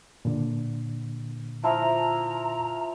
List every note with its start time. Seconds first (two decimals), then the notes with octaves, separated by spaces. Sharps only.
0.25 A#2 D3
1.64 F3 E4 F4 A#5